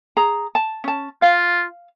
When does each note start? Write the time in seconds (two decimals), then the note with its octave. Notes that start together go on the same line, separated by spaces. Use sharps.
0.17 G#4 A#5
0.55 A5
0.84 C#4 A5
1.22 F4 F5